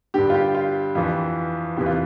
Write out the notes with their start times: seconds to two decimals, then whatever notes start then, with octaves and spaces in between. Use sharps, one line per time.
0.14 G2 D3 G4
0.30 F4
0.34 G4
0.55 F4
0.95 F2 E3 F4
1.77 E2 C3 E3 G4
1.86 F4